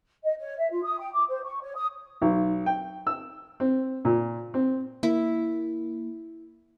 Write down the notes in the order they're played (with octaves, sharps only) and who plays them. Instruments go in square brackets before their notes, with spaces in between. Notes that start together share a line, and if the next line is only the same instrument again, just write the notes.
[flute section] D#5
C#5
E5
F4
D#6
G5
D6
C5
C#6
C#5
D#6
[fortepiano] B1
G5
E6
C4
A#2
C4
[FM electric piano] A#3 [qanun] E4